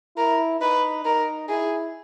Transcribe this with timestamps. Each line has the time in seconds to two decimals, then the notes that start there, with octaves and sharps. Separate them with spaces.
0.17 E4 A#4
0.60 D#4 B4
1.05 D#4 A#4
1.49 E4 G#4